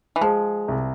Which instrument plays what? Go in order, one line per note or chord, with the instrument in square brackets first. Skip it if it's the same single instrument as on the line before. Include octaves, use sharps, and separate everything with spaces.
[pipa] E3
[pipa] F3 [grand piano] G#3
[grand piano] C2